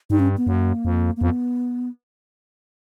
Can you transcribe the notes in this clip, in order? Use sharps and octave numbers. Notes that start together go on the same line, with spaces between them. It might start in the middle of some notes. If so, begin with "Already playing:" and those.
G2 D#4
C#4
B3
F#2 A#3
F2
A#3
F2 B3